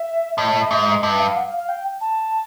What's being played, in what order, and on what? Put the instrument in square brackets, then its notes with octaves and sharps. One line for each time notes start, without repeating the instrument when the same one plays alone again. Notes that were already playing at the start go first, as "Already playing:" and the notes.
Already playing: [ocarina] E5
[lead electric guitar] A2 [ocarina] D#5
[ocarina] E5
D#5
E5
[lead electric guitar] G#2 [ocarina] D#5
[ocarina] E5
D#5
[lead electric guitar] G2 [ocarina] E5
[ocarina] F5
F#5
F5
F5
G5
A5